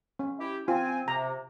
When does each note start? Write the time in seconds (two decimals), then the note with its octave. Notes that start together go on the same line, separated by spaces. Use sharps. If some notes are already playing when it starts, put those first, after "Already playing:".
0.19 C#4
0.39 E4 G4
0.68 C4 F4 G#5
1.08 C3 A#5